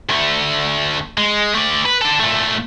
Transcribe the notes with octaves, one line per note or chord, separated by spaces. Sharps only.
D2 A3
G#3
A3 D5
B4
D4 A4
A#2 A3